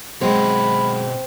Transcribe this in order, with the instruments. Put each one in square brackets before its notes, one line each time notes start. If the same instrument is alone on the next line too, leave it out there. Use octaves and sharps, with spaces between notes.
[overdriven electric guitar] B2 C5 [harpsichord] F#3 G#3 [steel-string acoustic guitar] C4 [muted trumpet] B5